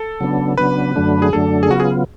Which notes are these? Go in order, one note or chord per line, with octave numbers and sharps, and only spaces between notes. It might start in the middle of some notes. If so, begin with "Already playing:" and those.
Already playing: A4
C#3 F#3 B3 D4
C#3 F#3 B3 D4 B4
F#2 D3 F#3 A3 D4
G#4
F#2 D3 F#3 A3 D4 A4
G#4
C#3 F#3 B3 F4 F#4
G#4